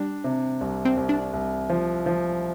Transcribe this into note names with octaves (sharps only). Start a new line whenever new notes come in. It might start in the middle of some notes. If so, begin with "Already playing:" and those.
Already playing: G3 D4
C3
C2
C4
C2
D4
C2
F3
F3